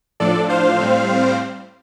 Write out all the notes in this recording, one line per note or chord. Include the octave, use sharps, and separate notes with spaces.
A2 F3 D4 A4 D5
C5 F5
A2 G3 C4